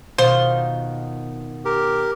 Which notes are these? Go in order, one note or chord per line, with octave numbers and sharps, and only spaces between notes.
B2 D#3 F4 C5
G4 A#4